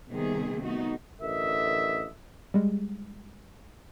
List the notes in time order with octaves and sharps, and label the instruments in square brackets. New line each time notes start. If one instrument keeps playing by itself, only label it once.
[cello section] C3 D#3 G3 A#3 B3 G#4
A3 B3 D#4 F#4
[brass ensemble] A1 D3 A#4 D#5 E5
[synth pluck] G3 G#3